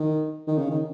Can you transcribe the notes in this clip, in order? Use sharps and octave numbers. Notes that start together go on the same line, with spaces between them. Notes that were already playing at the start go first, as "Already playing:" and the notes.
Already playing: D#3
D#3
C#3
D#3